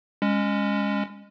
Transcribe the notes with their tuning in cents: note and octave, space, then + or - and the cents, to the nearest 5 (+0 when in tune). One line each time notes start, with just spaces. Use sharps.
G#3 -25 C#4 -5